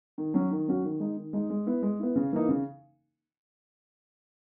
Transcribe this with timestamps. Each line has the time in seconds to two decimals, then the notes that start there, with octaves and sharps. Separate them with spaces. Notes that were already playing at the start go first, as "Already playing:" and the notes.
0.18 D#3
0.34 F#3 C#4 F#4
0.51 D#3
0.68 F#3 C#4 F#4
0.84 D#3
1.00 G#3 D#4
1.17 D#3
1.33 G#3 D#4
1.50 G#3
1.66 B3 E4
1.83 G#3
1.99 B3 E4
2.16 C#3
2.33 E3 A#3 D#4
2.49 C#3